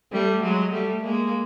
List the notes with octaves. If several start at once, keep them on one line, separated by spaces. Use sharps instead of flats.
G3 A3
F#3 G#3
G3 A3
G#3 A#3